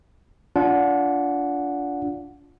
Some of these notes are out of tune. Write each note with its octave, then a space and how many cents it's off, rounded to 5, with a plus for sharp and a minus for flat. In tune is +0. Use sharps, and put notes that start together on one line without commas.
D4 -30 F4 -5 F#5 -10